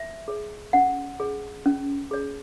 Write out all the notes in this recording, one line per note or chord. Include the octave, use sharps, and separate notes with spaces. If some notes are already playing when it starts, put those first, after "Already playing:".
Already playing: E5
G#4 C#5
C#4 F#5
G#4 C#5
C#4
G#4 C#5